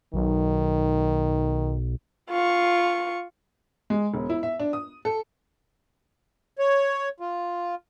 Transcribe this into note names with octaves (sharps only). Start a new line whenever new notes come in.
B1 D#3
F4 C#6
G#3
E1
E4
E5
D4
D#6
A4
C#5
F4